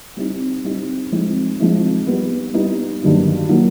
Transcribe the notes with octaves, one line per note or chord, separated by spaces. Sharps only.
G3 C4 D#4
G3 C4 D#4
F3 G#3 C4 D#4
F3 G#3 C4 D#4
G3 B3 D#4
G3 B3 D#4
G2 D#3 F#3 A#3
D#3 F#3 A#3